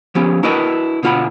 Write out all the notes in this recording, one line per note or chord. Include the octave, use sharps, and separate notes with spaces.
F3 B3 C#4 G4
D4 E4 F#4 A#4 B4 D#5
B2 D3 F4 F#5 B5